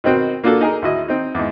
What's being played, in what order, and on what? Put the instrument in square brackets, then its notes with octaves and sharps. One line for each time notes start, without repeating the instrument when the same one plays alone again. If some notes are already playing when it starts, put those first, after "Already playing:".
[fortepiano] B2 D#3 C4 F#4
A#3 D4 F4 F#4 A4
D#4 G#4 A#4
D2 E4 F#4 D#5
C4 D#4
E2 G#2